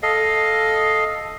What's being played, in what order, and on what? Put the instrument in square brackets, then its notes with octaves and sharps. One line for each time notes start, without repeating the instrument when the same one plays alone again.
[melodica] A4 D#5 F5